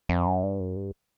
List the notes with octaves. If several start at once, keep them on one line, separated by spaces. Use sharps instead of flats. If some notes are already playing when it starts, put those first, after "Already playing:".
F2
F#2
G2
F#2
G2